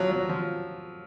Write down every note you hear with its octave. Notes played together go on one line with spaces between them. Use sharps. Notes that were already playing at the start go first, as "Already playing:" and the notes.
Already playing: F3 F#3
F#3
F3